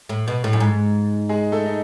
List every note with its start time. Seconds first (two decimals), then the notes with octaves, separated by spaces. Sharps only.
0.09 A2
0.28 B2
0.44 A2
0.53 F#2
0.60 G#2
1.29 G#3 G#4
1.52 A3 A4
1.66 D#4